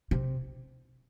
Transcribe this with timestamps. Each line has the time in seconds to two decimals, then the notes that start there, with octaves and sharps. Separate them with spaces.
0.11 C3